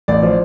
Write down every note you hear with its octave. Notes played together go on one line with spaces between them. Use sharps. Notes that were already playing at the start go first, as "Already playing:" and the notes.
A1 D5
F3